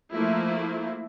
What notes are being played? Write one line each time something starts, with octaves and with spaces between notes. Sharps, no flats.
F3 A3 A#3 E4